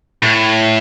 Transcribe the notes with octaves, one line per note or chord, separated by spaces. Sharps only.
A2